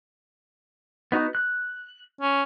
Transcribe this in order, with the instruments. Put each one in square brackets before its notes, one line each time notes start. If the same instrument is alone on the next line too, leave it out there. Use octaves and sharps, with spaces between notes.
[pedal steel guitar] B3 D#4 F#4
F#6
[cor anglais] C#4